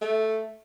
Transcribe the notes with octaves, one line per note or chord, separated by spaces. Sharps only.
A3